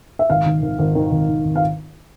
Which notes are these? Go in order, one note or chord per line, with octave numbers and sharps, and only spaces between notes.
E5
G#1 F5
D#3
G#1
G#1
D#3
G#1
G#1
G#1
F5